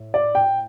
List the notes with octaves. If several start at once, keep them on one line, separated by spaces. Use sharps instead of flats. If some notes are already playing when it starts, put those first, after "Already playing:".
Already playing: A2
D5
G5